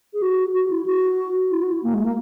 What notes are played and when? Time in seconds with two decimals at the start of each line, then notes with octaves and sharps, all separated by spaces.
0.13 G#4
0.21 F#4
0.54 F#4
0.70 E4
0.86 F#4
1.51 E4
1.62 F#4
1.72 E4
1.83 A#3
1.93 G#3
2.04 A#3